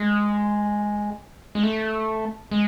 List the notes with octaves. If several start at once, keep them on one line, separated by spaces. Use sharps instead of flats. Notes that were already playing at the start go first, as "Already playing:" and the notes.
Already playing: G#3
G#3
A3
G#3